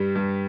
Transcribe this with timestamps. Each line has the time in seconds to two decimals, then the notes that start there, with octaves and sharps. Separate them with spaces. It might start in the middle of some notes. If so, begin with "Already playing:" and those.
Already playing: G2 G3
0.15 G2